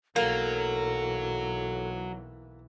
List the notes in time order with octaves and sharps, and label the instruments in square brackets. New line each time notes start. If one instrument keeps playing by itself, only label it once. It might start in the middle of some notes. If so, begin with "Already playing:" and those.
[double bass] B1 E3 [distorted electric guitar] F#3 [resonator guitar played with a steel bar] A#3 [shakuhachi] A4